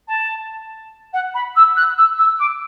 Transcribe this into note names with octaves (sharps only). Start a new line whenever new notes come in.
A5
F#5
B5
E6
F#6
E6
E6
D6